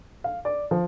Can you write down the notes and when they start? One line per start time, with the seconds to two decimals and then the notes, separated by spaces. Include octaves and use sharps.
0.24 F5
0.45 D5
0.71 F3